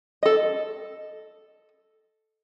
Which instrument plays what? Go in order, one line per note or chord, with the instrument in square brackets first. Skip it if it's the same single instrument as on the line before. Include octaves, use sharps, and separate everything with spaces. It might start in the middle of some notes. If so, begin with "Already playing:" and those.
[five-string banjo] A4 D#5